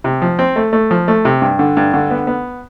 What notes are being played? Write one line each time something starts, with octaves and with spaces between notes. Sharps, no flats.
C3
F3
C4
A3
A3
F3
A3
C3
G2
D3
G2
D3
B3
B3